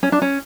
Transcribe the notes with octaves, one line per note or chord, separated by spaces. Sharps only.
C#4
D4
C#4